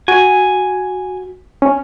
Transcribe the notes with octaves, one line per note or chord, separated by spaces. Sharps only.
F#4 G#5
C#4